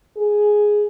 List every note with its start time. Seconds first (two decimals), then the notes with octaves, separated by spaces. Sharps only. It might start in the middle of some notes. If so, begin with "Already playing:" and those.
0.17 G#4